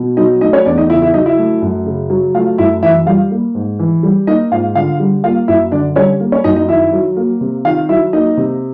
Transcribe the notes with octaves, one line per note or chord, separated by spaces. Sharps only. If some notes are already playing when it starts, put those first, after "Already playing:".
Already playing: B2
F#3 D#4 D#5
A3 D#4 D#5
C#4 C#5
E2 D4 D5
D#4 D#5
C#3 E4 E5
E4 E5
F#3 D#4 D#5
E4 E5
A3
F#2
C#3
F#3
A3 F4 F5
F#2 E4 E5
E3 E4 E5
G3 F4 F5
A#3
G#2
E3
G3
A#3 D#4 D#5
G#2 F4 F5
D3 F4 F5
G3
A#3 F4 F5
F#2 E4 E5
D3 D4 D5
G3 C#4 C#5
A#3
C#4 C#5
F#2 D#4 D#5
D#4 D#5
D#3 E4 E5
F#3
A#3
C3
D#3 F4 F5
F#3 E4 E5
A#3 D#4 D#5
C3